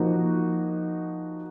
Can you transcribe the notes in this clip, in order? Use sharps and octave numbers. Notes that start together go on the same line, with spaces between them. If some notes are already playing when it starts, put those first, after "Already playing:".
Already playing: F3 A#3 D#4 F#4